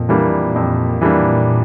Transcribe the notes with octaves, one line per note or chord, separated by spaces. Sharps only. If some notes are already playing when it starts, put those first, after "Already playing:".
Already playing: F2 A#2
E3 G3 A#3 D4
F2
E3 G3 A#3 D4